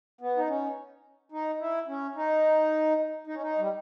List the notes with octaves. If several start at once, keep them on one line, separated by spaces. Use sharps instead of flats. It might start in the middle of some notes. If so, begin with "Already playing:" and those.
B3
D#4
C#4
D#4
E4
C#4
D#4
D#4
C#4
D#4
G3